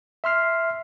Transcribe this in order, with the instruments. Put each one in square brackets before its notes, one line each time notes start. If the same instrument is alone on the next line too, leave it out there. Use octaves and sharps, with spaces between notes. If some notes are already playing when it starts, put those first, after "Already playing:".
[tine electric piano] E5 C6 F6 C7